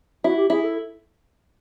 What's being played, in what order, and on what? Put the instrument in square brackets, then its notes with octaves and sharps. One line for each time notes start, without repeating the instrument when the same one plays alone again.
[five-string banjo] E4 [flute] F#4
[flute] G4
[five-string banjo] E4 [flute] G#4
[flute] A4